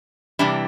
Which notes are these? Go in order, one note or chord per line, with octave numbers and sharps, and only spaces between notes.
C3 E3 G3 D4 E4